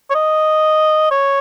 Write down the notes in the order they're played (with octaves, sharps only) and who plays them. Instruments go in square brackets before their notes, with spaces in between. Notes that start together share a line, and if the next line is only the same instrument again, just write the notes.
[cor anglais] C#5
D#5
C#5